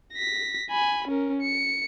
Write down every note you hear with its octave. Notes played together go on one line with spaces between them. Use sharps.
A#6 B6
G#5 B5
C#4 A#4
C#7